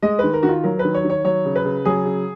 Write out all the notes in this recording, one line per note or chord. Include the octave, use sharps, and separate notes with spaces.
G#3 D#5
D#3 B4
A#4
D#3 F#4
F4
F#3 A#4
B4
D#3
C#5
D#3 C#5
F#3 C#5
C#3
B4
C#3
F#3 G#4
C#3